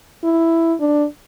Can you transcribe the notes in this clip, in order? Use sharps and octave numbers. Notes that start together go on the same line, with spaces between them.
E4
D4